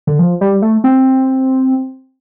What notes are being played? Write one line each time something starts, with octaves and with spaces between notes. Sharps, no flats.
D3
F3
G3
A3
C4